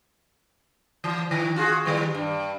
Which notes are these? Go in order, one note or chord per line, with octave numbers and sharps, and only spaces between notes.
E3
D#3
F4 F#4 G#4
D#3 G3 B3
G2